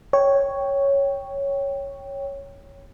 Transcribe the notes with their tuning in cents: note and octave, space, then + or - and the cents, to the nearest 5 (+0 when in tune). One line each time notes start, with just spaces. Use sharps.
C#5 +0 G5 +0